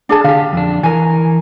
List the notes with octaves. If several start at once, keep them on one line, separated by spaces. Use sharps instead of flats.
D4 G#4 A5
D3 G4 F5
F2 D4
E3 A#4 G#5